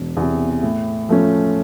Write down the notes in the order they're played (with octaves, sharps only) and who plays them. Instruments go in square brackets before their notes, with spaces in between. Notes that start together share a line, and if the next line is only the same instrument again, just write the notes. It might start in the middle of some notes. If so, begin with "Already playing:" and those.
Already playing: [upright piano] E1
E2 C3
A2
F3 A3 C#4